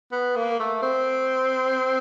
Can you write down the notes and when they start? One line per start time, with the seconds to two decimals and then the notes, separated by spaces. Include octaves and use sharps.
0.12 B3
0.36 A#3
0.60 A3
0.82 C4